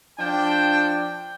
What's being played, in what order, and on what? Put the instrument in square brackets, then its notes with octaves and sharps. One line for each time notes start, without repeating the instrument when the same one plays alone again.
[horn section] F3 D4 G5